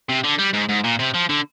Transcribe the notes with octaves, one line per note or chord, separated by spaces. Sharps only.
C3
D3
G3
G#2
G#2
A#2
C3
F3
D3